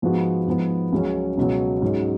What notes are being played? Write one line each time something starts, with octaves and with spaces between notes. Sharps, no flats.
G#2 F3 B3 F#4
G#2 F3 B3
C#2 C#3 F#3 C#4
C#2 B2 F#3
G#2 F#3 C#4